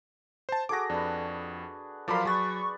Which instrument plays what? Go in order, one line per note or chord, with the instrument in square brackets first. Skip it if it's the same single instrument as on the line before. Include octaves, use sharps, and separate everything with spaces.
[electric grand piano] C5 A5
[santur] F#4 G#4 A4 [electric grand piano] D6 A#6
[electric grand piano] F2 [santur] D4 B4
[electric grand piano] F3 F#3 B5 [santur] A4 D5 [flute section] A#4 F5 C6
[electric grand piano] F#3 A6 [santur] G#4 B4 [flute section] C#6